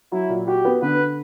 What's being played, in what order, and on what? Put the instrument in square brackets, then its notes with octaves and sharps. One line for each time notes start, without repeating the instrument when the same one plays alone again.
[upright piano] F#3 [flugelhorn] E4
[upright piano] A#2
[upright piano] F#4 [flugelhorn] G4
[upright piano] B3
[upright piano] D3 [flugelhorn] B4